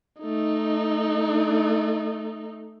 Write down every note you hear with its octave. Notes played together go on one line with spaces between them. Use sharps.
A3 D#4